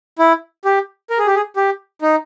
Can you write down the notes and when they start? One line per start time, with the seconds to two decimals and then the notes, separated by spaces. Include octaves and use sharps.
0.19 E4
0.65 G4
1.10 A#4
1.19 G#4
1.27 G4
1.35 G#4
1.56 G4
2.02 D#4